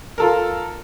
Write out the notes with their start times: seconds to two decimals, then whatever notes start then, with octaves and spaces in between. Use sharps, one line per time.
0.18 F4 A4 A#4